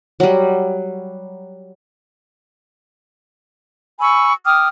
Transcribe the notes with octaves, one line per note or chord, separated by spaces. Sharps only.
F#3 G3
G#5 B5 C#6 E6
G5 D6 D#6 F6